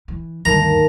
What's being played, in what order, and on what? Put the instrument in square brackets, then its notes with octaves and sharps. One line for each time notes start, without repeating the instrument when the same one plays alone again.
[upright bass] E3
[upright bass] D2 G2 [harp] D#3 A#3 A5 [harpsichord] A#5